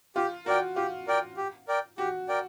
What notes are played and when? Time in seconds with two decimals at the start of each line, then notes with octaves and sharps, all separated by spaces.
0.16 F4 G4
0.46 F#4 A#4 D5 G5
0.76 F4 G4
1.07 A#4 D5 G5
1.37 G4
1.68 A#4 D5 G5
1.98 F#4 G4
2.29 A#4 D5 G5